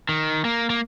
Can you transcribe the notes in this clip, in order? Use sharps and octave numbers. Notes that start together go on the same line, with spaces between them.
D#3
A#3
A#3